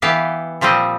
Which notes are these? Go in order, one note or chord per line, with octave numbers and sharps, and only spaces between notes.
E3 B3 G4 F5
A#2 F3 G3 C4 D#5